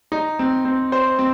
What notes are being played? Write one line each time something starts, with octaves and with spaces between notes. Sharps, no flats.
D#4
C4
C4
C5
C4